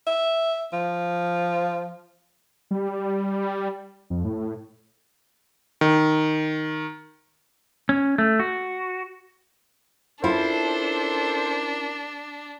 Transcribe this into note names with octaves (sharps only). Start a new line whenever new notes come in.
E5
F3
G3
F2
A2
D#3
C#4
A3
F#4
C#4 D4 E4 F4 A4 A#4 C5